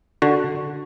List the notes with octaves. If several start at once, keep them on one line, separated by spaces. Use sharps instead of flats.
D3 F#4